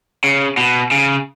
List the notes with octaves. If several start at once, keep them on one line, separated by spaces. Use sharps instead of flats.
C#3
B2
C#3